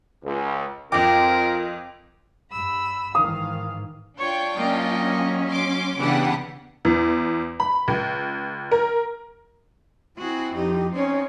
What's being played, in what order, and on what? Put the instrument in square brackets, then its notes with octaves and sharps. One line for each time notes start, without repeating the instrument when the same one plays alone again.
[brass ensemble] C#2
[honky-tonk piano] F2 D6 [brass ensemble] C4 F4 [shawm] A#4 [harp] G5
[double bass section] G2 [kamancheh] B5 E6
[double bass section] G#2 D#3 E3 [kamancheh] F5 [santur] D#6
[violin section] D4 F4 G5 [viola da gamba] C#5
[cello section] F#3 C#4 [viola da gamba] A#3 D#5
[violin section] C6 D6
[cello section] C#3 B3 B4 [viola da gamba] E3 D4 [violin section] G4 F#5
[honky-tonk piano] E2
B5
C#2
A#4
[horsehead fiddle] C4 E4 [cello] F#4 G#4
[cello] F2 D#4 [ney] G4
[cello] C4 D#4 [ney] C#4 [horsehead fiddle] C#5